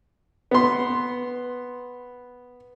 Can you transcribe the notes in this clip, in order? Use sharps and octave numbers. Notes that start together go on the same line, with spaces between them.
B3 C6